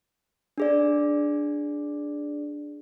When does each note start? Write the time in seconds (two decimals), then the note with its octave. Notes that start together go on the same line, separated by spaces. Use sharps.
0.58 D4 G#4 D5